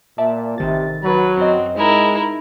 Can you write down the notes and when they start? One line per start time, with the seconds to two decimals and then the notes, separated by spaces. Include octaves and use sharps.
0.18 A#2 D5 E5 A5
0.58 A1 C3 D#3 A6
1.03 F#3 B4
1.37 F#2 C4 D#5
1.76 G#3 D#4 E4 A#4